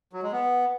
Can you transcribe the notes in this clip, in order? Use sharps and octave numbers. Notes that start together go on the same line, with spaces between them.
F#3
G#3
B3